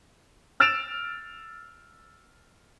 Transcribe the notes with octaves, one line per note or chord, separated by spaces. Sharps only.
E6 F6 A6 D7 E7 F7